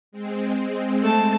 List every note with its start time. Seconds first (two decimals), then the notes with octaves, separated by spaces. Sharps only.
0.12 G#3 C4
1.02 A3 A5